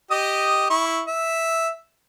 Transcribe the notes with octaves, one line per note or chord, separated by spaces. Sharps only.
G4 D#5 D#6
E4 C#6
E5